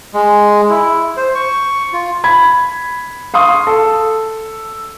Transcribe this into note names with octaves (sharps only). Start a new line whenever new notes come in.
G#3
E4
C5
C#6
F4
B5 G#6
F5 C6 C#6 D#6
A4